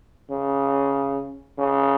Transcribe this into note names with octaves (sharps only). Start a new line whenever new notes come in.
C#3
C#3